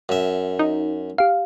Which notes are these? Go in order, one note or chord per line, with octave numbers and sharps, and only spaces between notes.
F#2 E5
D#4
G4 F5